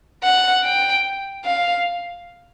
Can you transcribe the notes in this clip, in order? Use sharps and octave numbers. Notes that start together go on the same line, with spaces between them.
F#5
G5
F5